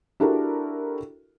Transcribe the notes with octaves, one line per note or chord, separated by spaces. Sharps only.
D4 E4 F#4 G4 A4 A#4